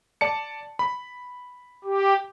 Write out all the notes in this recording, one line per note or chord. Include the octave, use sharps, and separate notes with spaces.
D5 A5 C#7
B5
G4